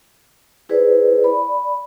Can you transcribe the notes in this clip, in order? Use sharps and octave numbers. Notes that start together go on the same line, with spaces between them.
E4 G#4 B4 C5 D5
D5 B5